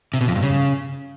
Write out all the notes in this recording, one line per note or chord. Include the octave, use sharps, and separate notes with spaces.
C3
B2
F2
G2
C#3